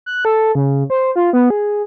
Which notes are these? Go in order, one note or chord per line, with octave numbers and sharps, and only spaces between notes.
F#6
A4
C#3
C5
F4
B3
G#4